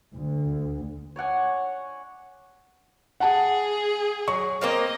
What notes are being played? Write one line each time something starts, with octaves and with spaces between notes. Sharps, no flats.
D2
C#5 D5 F#5 G#5
G#4 F#5 A5
F#3 C#6
A#3 C4 D#5 F5